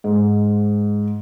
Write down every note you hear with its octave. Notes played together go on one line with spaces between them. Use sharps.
G#2